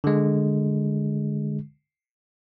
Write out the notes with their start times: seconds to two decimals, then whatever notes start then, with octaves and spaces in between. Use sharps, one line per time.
0.04 D3 G#3